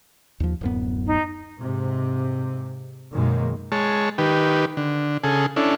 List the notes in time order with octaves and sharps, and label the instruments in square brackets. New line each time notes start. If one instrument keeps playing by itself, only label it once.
[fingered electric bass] D#2 F3
D1 F#2 B3
[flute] D#4
[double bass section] G#2 C3
F#2 B2 D#3 G#3 A#3
[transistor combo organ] G#3 C#5 A5
D#3 G4 B4
D3
C#3 G#4 A4
C#4 D4 E4 A4